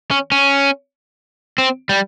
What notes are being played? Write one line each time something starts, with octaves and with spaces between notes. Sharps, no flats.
C#4
C#4
C4
G3